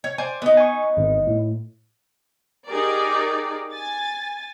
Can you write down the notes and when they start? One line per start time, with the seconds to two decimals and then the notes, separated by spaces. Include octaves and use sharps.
0.04 C#5
0.18 C5 D5 G#5
0.42 B3 D#4
0.57 G#5 C#6
0.97 G#1
1.27 A2
2.67 D#4 G4 G#4 A#4 D5
3.72 G#5 A6